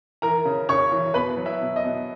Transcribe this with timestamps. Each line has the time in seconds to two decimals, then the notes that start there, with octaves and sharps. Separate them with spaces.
0.22 E3 A#4 A#5
0.45 C#3
0.69 C#3 C#5 C#6
0.92 E3
1.14 B2 B4 B5
1.37 F#3
1.45 E4 E5
1.61 B2
1.76 D#5
1.84 B2